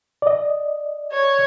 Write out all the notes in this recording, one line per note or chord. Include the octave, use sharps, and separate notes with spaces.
D5 D#5
C#5